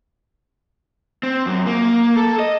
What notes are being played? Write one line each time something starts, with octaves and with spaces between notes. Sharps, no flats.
C4
F#2
A#3
A4
D#5